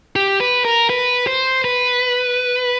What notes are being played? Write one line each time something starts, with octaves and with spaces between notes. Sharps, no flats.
G4
B4
A#4
B4
C5
B4